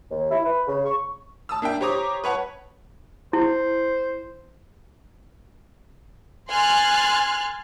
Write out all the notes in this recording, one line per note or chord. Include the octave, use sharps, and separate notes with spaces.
D#2
E4
B4
C#3
C#6
A5 D#6 E6
A#3 D4 E5 G5
G4 C5 C#5 A#5 D6 D#6
B4 C#5 F#5 A5
E4 C5
G#5 C6 F6 F#6 A6